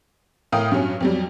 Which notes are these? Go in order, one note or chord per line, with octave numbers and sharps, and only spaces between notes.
A2 A#4 F5 G5 D#6 F6
G2 F#3 C#4
F2 F#3 G3